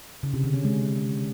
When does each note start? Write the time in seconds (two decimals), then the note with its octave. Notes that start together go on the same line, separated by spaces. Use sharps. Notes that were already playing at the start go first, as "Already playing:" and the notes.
0.23 C#3
0.34 C3
0.44 D3
0.54 C#4
0.65 G#3